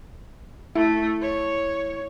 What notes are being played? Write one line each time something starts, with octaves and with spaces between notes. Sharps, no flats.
A3 E4
C#5